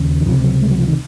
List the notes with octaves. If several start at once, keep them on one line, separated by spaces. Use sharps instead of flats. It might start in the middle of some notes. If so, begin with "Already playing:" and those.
Already playing: D#2 C#3
D#3
C#2 C3 F3
F#3
G#3
F#3
F3
D#3